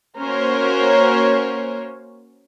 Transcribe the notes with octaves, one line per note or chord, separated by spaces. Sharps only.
A#3 C#4 F#4 A#4 C5 C#5